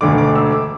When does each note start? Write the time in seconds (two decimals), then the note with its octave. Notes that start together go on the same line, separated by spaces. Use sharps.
0.01 E1 D2 D3 D6
0.18 D6
0.36 E6
0.52 D6